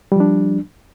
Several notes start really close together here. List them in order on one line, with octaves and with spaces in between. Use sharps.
G3 F3 D4